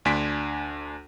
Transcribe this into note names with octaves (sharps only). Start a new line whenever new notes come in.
D2 D4 G#5 C6 B6 D7